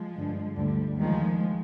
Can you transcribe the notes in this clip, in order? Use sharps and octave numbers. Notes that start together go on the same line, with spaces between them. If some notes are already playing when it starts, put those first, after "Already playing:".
Already playing: F3 G#3
G2 D3
D2 D3 G3
D#2 D#3 F3 G#3